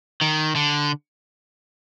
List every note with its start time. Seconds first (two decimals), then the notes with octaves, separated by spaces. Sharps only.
0.21 D#3
0.55 D3